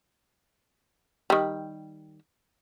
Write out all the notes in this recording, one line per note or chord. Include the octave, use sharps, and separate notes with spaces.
D#3 G3